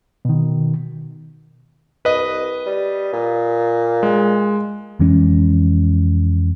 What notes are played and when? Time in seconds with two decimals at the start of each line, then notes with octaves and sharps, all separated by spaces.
0.25 B2 D#3
2.05 C2 B4 D#5
2.66 G3
3.13 A#2
4.03 G#3
4.99 F2 E3 G#3 C#4